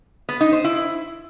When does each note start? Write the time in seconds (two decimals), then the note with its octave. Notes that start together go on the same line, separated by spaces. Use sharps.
0.29 B3
0.41 D#4
0.52 C5
0.64 E4